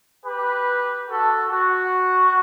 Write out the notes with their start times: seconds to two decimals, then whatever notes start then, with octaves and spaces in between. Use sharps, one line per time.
0.24 G4 B4
1.09 F#4 A4
1.51 F#4